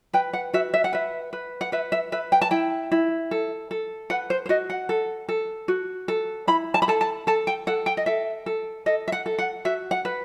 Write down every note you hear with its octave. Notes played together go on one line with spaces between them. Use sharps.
B4 G5
F#5
F#4 E5
E5
F#5
B4 E5
B4
F#5
B4 E5
E5
B4 E5
G5
A5
E4 G5
E4
A4
A4
B4 F#5
C5
C5
F#4 D#5
F#5
A4
A4
F#4
A4
E4 B5
A5
B5
A4 A5
A5
A4 A5
G5
A4 F#5
G5
D#5
A4 E5
A4
A4 D#5
E5
F#5
A4
F#5
F#4 E5
F#5
B4